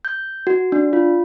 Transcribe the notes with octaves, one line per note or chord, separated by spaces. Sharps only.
G6
F#4
D4
F4